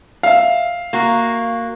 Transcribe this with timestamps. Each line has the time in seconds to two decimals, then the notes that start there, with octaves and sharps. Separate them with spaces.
0.23 E5 F5
0.93 A#3 F#4